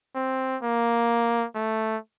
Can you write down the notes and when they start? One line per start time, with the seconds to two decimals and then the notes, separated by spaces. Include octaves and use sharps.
0.16 C4
0.63 A#3
1.55 A3